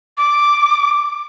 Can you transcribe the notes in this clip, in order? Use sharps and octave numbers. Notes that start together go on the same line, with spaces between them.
D6